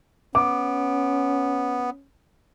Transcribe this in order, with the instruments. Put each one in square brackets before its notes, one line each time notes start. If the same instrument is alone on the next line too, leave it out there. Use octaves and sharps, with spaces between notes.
[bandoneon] B3 [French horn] C#4 [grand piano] D6